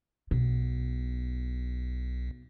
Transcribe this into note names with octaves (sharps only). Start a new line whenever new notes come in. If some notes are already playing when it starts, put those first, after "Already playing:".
B1 B2